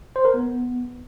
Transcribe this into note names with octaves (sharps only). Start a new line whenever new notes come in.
C5
A#4
B3